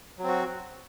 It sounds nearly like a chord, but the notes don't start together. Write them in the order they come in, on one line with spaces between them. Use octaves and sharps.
F#3 C4 F#4